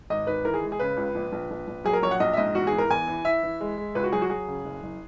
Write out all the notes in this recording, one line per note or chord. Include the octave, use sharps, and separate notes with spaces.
G#1 D#5
D#3 B4
E3 A#4
G#4
G#3
G#4
C#3 B4
C#2
A#1
A#1
A#1
A#1
F#3 G#4
A#4
A#1 C#5
F#5
A#1 D#5
E5
G#2 D#5
E2 F#4
G#4
E3
A#4
E2 G#5
E3
E3 E5
E3
G#3
G#3
C#2 B4
F#4
F#3 G#4
F#4
F#3 G#4
C#3
F#1
F#1